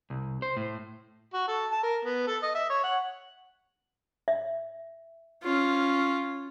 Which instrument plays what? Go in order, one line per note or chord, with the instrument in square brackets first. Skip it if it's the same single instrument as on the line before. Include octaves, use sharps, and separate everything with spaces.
[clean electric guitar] C2
C5
A2
[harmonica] F#4
A4
A5
A#4
B3
A4
D#5
E5
C#5
F#5
[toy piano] E5
[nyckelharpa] C#4 F4